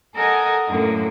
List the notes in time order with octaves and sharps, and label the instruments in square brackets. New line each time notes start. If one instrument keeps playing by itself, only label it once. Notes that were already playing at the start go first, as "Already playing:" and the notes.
[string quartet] A4 A#4 D#5 F#5 G#5
F#2 A2 D3 A#3